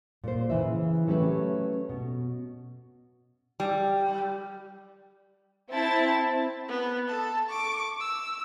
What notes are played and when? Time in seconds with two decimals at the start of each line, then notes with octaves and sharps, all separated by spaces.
0.24 A#2 C5
0.50 C#3 E3 E5
1.07 F#3 A3 C#4 G4 B4 E5
1.89 B2
3.60 G3
5.72 C4 E4 A5 A6
6.68 B3
7.08 A4 A5
7.49 C#6 D6
8.00 E6